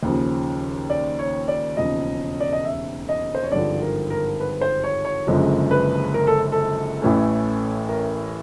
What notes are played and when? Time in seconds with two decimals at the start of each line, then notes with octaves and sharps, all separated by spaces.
0.03 D#2 C#3 F3
0.90 D5
1.19 C#5
1.48 D5
1.77 E1 D#2 C#3 F3 D#5
2.40 D5
2.53 D#5
2.65 E5
3.09 D#5
3.35 C5
3.43 C#5
3.52 G#1 G2 D3 F3 D5
3.82 A#4
4.10 A#4
4.40 B4
4.61 C5
4.84 C#5
5.05 C#5
5.27 F#1 F#2 D3 F3 G#3
5.71 B4
6.14 A#4
6.27 A4
6.52 A4
7.02 A1 A2 E3 A3 C#4
7.89 A#4